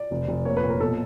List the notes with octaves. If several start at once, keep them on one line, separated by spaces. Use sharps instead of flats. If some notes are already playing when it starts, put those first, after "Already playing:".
Already playing: D5
F1
F1
A#3 C#5
B4
A#2
A#4
B2 A4